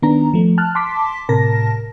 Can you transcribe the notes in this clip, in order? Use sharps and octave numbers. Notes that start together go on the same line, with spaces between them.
D#3 B3 D4 A#5
F3 A3
A5 F6 F#6
A5 C6 D6 B6
A2 C3 A#4 A5 A#6